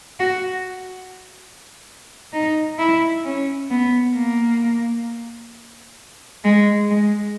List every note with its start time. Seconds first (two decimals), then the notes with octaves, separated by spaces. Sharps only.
0.20 F#4
2.33 D#4
2.79 E4
3.25 C#4
3.70 B3
4.15 A#3
6.45 G#3
6.91 G#3